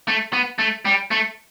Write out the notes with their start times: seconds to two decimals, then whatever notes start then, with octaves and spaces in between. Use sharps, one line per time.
0.08 A3
0.33 B3
0.59 A3
0.85 G3
1.11 A3